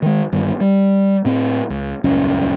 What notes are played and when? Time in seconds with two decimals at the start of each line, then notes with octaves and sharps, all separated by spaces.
0.02 D#3 G#3
0.32 G1 G2 D#3
0.60 G3
1.25 A2 C4
1.70 C#2
2.04 D#1 C#2 F#2 C#4